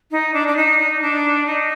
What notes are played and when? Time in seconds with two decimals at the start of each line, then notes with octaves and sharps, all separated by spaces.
0.11 D#4
0.34 D4
0.47 D4
0.56 D#4
0.79 D#4
1.01 D4
1.46 D#4